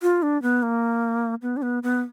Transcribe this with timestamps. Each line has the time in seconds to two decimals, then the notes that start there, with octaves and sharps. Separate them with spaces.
0.02 F4
0.23 D4
0.42 B3
0.63 A#3
1.42 B3
1.57 D4
1.62 B3
1.83 B3